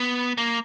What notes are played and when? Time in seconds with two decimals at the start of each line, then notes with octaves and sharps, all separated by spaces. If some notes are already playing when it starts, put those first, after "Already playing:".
Already playing: B3
0.38 A#3